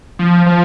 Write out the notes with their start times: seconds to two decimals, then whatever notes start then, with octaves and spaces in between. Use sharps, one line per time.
0.19 F3
0.46 F3